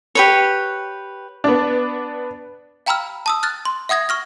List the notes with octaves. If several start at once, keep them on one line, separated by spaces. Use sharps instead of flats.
G4 B4 C#5
B3 D4
F5 G5 A#5 B5 E6 F6
A5 D#6 E6
F6 F#6 A6
C6
E5 F#5 D#6 G#6 A#6
C#6 F6 A#6